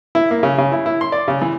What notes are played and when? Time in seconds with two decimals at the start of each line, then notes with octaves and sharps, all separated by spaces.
0.15 E4
0.31 A#3
0.43 C#3
0.58 C#3
0.72 E4
0.86 E4
1.01 C6
1.12 D5
1.28 C#3
1.41 E3